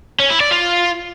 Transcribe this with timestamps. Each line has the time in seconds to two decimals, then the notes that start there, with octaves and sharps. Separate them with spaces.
0.19 C#4
0.30 E4
0.40 D5
0.51 F4